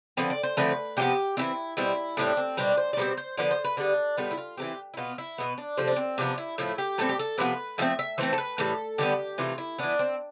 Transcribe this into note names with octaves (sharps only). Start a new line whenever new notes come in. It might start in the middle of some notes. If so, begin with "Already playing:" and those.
D3 F3 C4 B4
D5
C5
D3 F3 A3 C4 B4
C3 F3 B3 G4
E3 G3 C4 E4
B2 G3 C4 E4
A2 G3 C4 D4
C4
B2 G3 C4 D4
C5
D5
B2 G3 C4 C5
C5
D3 F3 B3 D5
C5
B4
D3 G3 B3 D4
A2 G3 B3 F4
E4
F4
E3 A3 C4 G4
E4
B2 B3 F4
E4
B2 B3
D4
C3 F3 A3 C4
D4
C4
C3 F3 B3 D4
E4
A2 F3 A3 E4
G4
A2 G3 C4 A4
G4
A4
C3 F3 B3 B4
D3 F3 A3 C4 E5
E5
E3 A3 C4 C5
A4
B4
A2 E3 G3 A4
D3 G3 B3 G4
C3 E3 A3 F4
E4
E3 B3 D4
C4